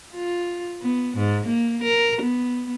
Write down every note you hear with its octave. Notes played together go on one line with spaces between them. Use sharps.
F4
B3
G#2
A#3
A#4
B3